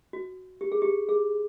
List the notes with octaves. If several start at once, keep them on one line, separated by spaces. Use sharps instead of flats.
F#4
G4
G#4
G4
G#4